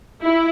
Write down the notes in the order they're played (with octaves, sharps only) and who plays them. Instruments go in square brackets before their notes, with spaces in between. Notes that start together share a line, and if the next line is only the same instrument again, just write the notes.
[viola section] E4